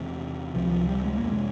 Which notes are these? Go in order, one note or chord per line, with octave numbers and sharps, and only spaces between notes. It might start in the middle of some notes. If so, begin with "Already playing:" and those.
Already playing: E2 C3
C#2 C3 F3
F3
G3
G#3
F2 C3 A#3
G#3